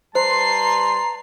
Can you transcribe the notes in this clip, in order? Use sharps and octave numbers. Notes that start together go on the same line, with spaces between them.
G3 B4 C5 A5 A#5 C6 C7